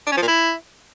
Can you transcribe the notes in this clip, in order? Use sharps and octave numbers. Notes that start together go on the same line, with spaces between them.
D4
C#4
F3
A#2
E4